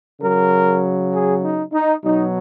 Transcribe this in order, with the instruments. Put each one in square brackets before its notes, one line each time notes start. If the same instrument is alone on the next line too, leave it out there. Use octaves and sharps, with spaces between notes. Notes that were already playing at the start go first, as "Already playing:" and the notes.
[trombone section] C#3 F#3 A#4
G#4
D#4
D#4
B2 F#3 D#4